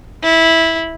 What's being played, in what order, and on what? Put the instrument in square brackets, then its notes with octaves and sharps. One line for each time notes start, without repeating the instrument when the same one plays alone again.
[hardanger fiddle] E4